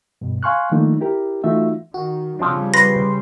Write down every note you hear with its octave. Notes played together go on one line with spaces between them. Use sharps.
G2 B2
F5 G#5 C6 C#6 F6 F#6
D#3 F3 A3 A#3 D4 D#4
E4 G4 A#4
E3 A3 D#4 F4 F#4 E5
D#3 F#4
C#3 F3 G3 C4 D4
B4 C6 A#6